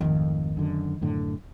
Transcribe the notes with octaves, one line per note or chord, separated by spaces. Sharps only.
G#1 F2 D#3 A3
F#2 D3
F#2 A2 D3